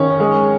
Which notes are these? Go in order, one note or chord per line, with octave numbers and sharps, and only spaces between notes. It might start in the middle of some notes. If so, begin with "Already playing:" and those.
Already playing: D#3 C#4 C#5
G#3